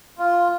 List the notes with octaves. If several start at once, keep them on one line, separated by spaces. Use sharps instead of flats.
F4